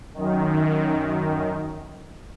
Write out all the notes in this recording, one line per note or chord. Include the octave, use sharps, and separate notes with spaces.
F#2 D#3